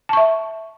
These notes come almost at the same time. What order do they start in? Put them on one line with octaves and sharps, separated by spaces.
A5 C#6 E5